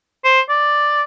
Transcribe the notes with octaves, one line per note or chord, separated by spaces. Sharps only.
C5
D5